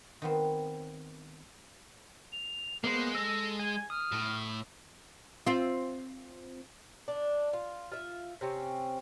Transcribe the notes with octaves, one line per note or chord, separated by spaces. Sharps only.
D#3 B3 C4
F7
G#3 A#3 B3 C5 C7
A4 E6 A#6
G#5 G#6
D#6 F6
A2
C4 F4
D4
F4
F4 E5
C3 C4 C#4